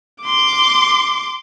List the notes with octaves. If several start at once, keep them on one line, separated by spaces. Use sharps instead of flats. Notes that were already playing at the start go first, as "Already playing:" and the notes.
C6 D6